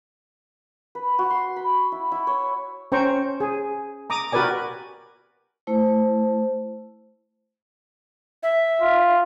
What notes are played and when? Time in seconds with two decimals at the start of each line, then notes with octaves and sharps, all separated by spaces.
0.95 B4
1.19 F#4
1.30 C6
1.56 B5
1.92 E4
2.11 E4
2.27 C#5
2.92 C#4 C5 G5 A#5 C#6
3.40 G#4
4.10 A#5 D6 D#6
4.32 F#4 G4 A#4 B4 D5 G#5
5.67 A3 E4 C5
8.43 E5
8.82 F4